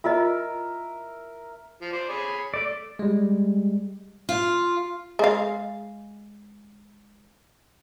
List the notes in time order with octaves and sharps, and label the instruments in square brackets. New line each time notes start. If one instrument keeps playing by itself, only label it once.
[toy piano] F4 D#5 [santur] A#4 E5
[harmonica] F3
C5 D5
G#4 C#5 B5
[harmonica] A3 [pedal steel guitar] D5
[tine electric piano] G3 G#3
[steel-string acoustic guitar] F4
[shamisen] G#3 F5